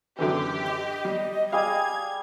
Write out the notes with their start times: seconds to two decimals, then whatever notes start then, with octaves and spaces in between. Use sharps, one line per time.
0.19 F#2 D3 E3 G4
0.67 D#5
1.05 G3
1.52 G3 G#4 F5 G#5 G#6